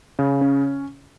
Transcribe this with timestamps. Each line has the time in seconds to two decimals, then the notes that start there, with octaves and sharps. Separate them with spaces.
0.19 C#3
0.41 C#4